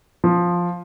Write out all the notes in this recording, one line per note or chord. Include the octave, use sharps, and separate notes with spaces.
F3